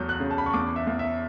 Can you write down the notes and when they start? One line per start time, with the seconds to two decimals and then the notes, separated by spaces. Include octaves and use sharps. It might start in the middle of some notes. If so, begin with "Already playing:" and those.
Already playing: E2 F#3 A3 G6
0.09 F#6
0.20 C#3
0.31 A5
0.38 B5
0.46 C#6
0.53 E2 D6
0.76 E5
0.87 E2
0.99 E5